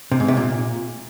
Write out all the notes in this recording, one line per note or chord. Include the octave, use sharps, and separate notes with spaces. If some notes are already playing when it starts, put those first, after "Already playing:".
C3
G#2
C3
A#2